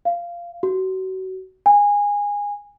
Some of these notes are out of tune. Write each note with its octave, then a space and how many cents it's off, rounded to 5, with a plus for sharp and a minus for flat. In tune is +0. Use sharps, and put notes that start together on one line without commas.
F5 -15
F#4 +30
G#5 -20